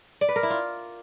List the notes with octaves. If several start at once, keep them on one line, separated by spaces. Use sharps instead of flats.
D5
B4
A#4
E4
F4